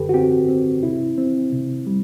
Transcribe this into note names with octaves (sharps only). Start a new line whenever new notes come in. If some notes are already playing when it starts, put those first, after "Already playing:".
Already playing: F#2 D3 G4 A4 B4
F#4
C4 G4
C4
C3 E4
C4
C3
G3